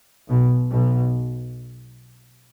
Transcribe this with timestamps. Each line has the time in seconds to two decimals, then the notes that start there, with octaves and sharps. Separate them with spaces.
0.29 B1 B2
0.71 B1 B2